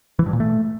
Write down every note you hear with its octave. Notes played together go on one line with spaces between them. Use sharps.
E3
G2
A#2
A3